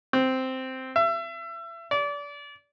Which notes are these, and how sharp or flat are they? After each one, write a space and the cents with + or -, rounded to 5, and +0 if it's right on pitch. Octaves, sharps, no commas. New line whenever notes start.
C4 -5
E5 +30
D5 -30